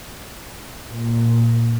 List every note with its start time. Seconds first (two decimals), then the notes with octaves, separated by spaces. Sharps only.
0.90 A#2